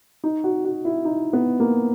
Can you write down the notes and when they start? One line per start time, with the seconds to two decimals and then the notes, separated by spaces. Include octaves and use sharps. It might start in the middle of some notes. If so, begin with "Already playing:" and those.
0.24 D#4
0.44 F#4
0.65 F#4
0.85 E4
1.05 D#4
1.33 B3
1.60 A#3